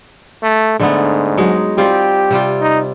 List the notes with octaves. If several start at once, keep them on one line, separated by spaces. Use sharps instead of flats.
A3
G#2 D3 A3 B3
F#3 G#3 D#4
G3 C4 F4 G4
C3 G3 F4
D#4